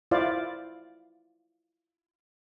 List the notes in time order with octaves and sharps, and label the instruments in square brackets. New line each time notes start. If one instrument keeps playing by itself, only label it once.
[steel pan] E4 F4 C5 D5 F5